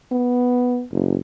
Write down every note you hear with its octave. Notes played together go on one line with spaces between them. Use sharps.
B3
F#1